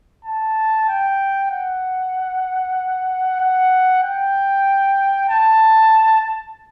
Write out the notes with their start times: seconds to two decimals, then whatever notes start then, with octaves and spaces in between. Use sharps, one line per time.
0.25 A5
0.89 G5
1.51 F#5
3.40 F#5
4.03 G5
5.29 A5